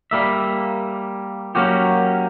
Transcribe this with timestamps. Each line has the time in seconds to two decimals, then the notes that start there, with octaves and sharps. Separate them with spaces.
0.11 G3 A#3 E5
1.55 F#3 A#3 C#4 F#4 G4